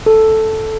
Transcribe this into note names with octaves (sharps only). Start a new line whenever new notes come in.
A4